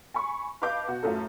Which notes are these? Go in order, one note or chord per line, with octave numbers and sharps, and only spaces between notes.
G#5 B5 C#6
B4 D#5 F5 A5 D6 G6
B2 F#4
A1 F#2 A3 F4 A4